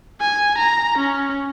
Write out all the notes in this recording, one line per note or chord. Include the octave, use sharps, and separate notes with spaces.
G#5
A#5
C#4